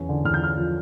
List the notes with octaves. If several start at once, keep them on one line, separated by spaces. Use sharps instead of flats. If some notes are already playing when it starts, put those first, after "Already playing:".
Already playing: E2 E3 C#4
D3
E2 F6
G6
C#4 F6
F3